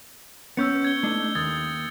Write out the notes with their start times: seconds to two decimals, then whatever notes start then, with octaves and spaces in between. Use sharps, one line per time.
0.57 B3 C#4 E6 G6 C#7
0.85 G#6 G7
1.03 A3 D4 D#4
1.35 D#2 D#6 G#6 A6